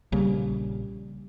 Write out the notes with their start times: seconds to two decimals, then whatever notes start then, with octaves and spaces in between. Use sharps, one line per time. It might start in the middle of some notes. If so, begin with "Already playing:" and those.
0.12 A#1 C#3 G3 A#3